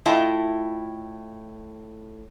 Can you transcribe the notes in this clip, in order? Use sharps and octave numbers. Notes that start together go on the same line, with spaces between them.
A2 E4 F4 D#5 G5 A5